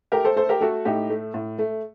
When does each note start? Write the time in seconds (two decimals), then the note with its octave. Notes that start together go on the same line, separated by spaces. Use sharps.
0.12 A3 G4 A#4
0.25 A4 C5
0.36 A3 A4 C5
0.49 G4 A#4
0.61 A3 F#4 A4
0.85 A2 D#4 G4
1.10 A3
1.34 A2
1.59 A3